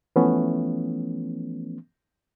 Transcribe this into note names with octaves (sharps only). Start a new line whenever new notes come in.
E3 F3 A3 B3 C#4